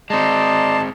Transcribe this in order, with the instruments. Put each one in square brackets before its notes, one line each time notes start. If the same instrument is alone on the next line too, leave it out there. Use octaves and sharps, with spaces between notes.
[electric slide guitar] G#3 C4 [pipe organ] D5 A#5 C6 [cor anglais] D#5 [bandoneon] A5